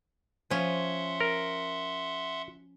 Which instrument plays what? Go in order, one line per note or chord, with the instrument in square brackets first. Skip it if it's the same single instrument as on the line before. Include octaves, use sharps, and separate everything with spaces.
[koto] F3 C#4 [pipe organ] E5 F#5 C6
[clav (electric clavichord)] A#4